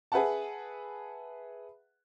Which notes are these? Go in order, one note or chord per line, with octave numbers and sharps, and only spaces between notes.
G#4 B4 E5 F#5 A5